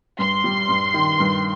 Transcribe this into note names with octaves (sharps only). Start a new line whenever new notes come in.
G2 C6
G3
G2
D#3
G2